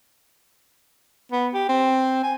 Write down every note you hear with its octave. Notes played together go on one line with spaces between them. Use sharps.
B3
G4
C4
G#5